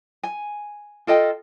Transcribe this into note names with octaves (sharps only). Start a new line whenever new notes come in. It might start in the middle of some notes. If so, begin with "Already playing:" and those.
G#5
F4 A4 D#5 G5